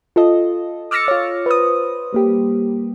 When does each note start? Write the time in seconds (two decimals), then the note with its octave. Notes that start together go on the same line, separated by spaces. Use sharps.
0.16 F4 A4 D#5
0.91 D6 E6 F6 A6 A#6 C#7
1.08 F4 C#5
1.46 B4 C5 D#6
2.12 G3 A#3 G4